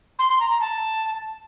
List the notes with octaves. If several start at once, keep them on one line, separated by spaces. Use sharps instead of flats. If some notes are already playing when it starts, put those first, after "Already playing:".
C6
C6
A#5
A#5
A5